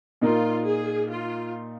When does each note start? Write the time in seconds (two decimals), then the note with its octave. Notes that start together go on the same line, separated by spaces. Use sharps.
0.21 A#2 A#3 D#4 F4 A#4
0.65 G#4
1.09 F4